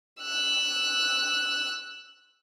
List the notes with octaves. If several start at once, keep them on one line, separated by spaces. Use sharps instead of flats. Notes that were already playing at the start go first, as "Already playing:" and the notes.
E6 F#6